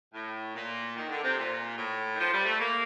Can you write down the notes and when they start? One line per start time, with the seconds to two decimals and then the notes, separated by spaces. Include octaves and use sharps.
0.13 A2
0.54 A#2
0.96 D#3
1.08 D3
1.22 C3
1.36 A#2
1.76 A2
2.13 D#3
2.18 F3
2.31 G3
2.45 A3
2.58 A#3